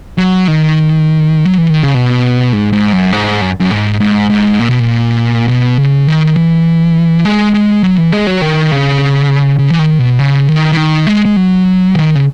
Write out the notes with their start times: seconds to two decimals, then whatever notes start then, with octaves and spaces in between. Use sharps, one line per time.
0.18 F#3
0.48 D#3
1.45 F#3
1.58 E3
1.70 D#3
1.83 C#3
1.94 B2
2.53 G#2
2.73 G#2
2.92 F#2
3.13 G#2
3.41 F#2
3.60 F#2
3.71 G#2
4.00 G#2
4.30 G#2
4.60 A#2
4.69 B2
4.80 A#2
5.48 B2
5.78 C#3
6.07 D#3
6.37 E3
7.25 G#3
7.54 G#3
7.83 F#3
7.98 E3
8.12 G#3
8.27 F#3
8.41 D#3
8.71 C#3
9.59 C#3
9.70 E3
9.79 D#3
9.99 B2
10.19 C#3
10.48 D#3
10.72 E3
10.77 D#3
11.07 G#3
11.25 G#3
11.36 F#3
11.95 D#3
12.15 C#3